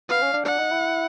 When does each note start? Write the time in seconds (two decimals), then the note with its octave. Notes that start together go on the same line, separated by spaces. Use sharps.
0.09 B3 F5
0.22 C#4
0.33 D4
0.45 D4 F#5
0.58 D#4
0.71 E4